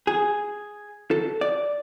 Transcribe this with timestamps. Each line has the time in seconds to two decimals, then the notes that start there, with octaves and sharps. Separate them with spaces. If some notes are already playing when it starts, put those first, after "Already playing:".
0.07 G#4
1.11 A4
1.41 D5